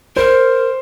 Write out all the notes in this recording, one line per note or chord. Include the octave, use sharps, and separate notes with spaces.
A#4 C5